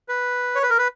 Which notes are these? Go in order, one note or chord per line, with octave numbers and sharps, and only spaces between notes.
B4
C#5
B4
A#4
B4